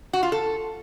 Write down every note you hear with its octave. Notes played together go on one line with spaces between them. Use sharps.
F#4
F4
A4